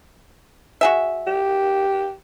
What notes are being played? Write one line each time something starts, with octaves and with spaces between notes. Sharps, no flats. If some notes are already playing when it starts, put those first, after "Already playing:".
F#4 G#4 E5
G4